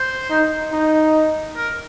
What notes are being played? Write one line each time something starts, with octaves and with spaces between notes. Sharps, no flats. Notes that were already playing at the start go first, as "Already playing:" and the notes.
Already playing: C5
D#4
D#4
A#4